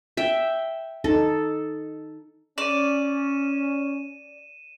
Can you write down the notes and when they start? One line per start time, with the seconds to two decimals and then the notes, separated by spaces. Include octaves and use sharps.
0.17 E5 G5
1.04 D#4 A4
2.58 C#4 D5 D#7 E7